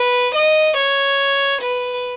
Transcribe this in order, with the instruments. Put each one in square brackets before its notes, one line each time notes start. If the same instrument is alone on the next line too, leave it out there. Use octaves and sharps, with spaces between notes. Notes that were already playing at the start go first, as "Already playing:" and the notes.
Already playing: [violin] B4
D#5
C#5
B4